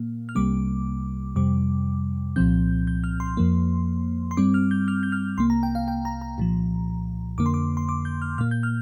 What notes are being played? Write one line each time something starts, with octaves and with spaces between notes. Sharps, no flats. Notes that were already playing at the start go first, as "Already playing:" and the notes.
Already playing: A#2 A#3
F6
C2 C3 G3 A#3 D6
F2 C3 G3 D6
C2 A#2 F3 C4 G6
G6
F6
C6
F2 F3 A#3
C6
G2 G3 C4 D6
F6
G6
F6
G6
F6
C2 C3 A#3 C6
A#5
G5
F5
G5
A#5
A#5
C2 A#2 F3
F2 D3 A#3 D6
C6
D6
C6
D6
G6
F6
A#2 A#3 F6
G6
F6